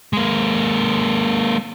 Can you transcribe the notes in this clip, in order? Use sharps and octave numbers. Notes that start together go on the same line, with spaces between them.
G#3 A#3